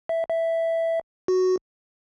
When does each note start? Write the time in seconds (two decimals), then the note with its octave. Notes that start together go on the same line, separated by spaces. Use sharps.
0.09 E5
0.30 E5
1.28 F#4